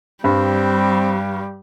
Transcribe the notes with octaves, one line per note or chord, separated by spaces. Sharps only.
G2 G3 C4